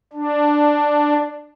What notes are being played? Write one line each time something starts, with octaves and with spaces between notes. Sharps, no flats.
D4